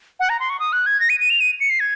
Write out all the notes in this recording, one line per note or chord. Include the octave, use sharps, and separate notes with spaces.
F#5
A#5
C6
C#6
D#6
F#6
G#6
A#6
D#7
D#7
F7
D#7
C#7
C7
G#6